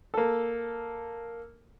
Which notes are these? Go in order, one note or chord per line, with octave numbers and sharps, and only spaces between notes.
A#3 A4